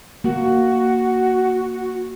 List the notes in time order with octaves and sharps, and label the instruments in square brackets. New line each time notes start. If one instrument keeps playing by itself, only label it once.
[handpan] A#3 [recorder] F#4